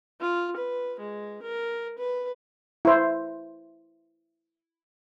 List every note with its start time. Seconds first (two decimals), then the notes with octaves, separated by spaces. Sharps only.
0.21 F4
0.57 B4
1.00 G#3
1.42 A#4
1.98 B4
2.85 E4 C5